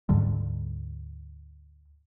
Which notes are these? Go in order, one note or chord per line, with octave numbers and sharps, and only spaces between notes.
D2 G#2 D3 G3